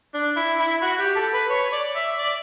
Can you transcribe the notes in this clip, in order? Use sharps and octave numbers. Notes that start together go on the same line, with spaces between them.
D4
E4
E4
F#4
G4
A4
B4
C#5
D5
E5
D5